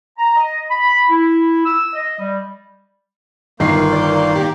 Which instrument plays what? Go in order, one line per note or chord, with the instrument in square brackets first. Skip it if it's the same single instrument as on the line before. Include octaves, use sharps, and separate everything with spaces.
[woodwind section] A#5
D#5
B5
E4
E6
D#5
G3
[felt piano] G1 C7 [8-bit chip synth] D#3 [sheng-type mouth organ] A#3 C6 G6 [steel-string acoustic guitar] D#4
[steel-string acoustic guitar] D5
A#3 G4